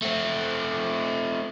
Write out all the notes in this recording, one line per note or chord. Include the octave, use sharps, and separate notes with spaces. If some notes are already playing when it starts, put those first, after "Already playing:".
A3 C4